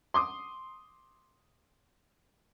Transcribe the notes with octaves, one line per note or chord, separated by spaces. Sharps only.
C6 D6 D#6